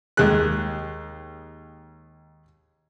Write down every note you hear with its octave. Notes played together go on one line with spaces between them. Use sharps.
D#2 G#3 F#6